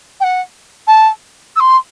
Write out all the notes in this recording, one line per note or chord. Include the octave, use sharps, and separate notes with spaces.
G5
F#5
A5
E6
C6